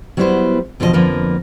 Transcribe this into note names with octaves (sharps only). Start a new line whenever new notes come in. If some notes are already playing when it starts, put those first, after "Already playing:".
F#3 G3 B3 E4 B4 C5
E2 B2 D3 F3 A#4 D#5
F2 D3 F3 A#3 A#4 B4